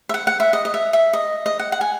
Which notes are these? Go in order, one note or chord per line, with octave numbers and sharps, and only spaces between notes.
E5
F#5
F#5
E5
D#5
D#5
E5
E5
D#5
D#5
F#5
F#5
G#5